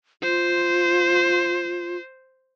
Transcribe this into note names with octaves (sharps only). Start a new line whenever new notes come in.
F4 C5